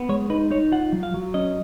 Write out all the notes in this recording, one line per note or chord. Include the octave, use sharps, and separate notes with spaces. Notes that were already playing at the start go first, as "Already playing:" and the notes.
Already playing: B3
G#3 C#5
D#4 B4
D#4 C#5
F4 F#5
F#3
F5
F#3
C#4 D#5